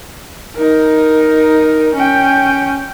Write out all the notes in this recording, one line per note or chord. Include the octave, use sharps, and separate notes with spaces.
D#4 A#4
C#4 G5